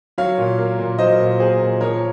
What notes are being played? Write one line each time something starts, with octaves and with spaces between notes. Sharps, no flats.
F#3 C#5 F5
A#2
A#3
A#2
F#3 C5 D#5
A#2
A#3 G#4 C5
A#2
F3 A#4 C#5